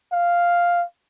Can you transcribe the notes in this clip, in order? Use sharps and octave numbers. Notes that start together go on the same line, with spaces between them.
F5